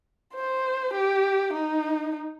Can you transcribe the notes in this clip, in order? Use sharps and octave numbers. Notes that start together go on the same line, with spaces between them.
C5
G4
D#4